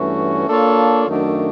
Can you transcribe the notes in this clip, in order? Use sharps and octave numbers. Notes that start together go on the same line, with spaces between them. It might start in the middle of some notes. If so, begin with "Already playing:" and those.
Already playing: G2 E3 A3 C#4 F#4
A#3 D4 F4 A4 C#5
F#2 D#3 F#3 A3 D4